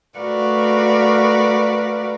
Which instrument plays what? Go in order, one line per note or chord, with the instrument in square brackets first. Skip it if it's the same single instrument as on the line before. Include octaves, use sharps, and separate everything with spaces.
[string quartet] A3 F#4 A#4 B4 D5 F5